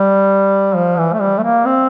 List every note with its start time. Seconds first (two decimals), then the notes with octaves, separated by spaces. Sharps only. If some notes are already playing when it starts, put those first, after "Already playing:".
Already playing: G3
0.75 F3
0.98 E3
1.13 A3
1.20 G3
1.38 A3
1.43 A#3
1.66 C4